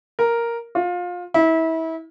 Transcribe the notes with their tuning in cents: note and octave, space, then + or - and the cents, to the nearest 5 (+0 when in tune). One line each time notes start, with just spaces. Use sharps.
A#4 +0
F4 +25
E4 -30